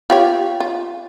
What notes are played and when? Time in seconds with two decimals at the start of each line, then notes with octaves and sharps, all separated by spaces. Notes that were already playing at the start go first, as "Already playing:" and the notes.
0.10 F4 G4 C#5
0.60 F4